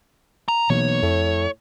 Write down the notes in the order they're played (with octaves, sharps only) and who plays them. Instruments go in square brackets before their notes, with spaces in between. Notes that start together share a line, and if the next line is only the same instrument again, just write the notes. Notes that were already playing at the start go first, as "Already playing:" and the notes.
[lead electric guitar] A#5
[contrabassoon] B1 [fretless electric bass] B2 E3 A#3 [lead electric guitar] C#5
[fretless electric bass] F2 [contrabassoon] A2